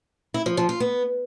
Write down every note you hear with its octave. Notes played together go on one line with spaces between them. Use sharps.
E4
F3
F3
F4
B3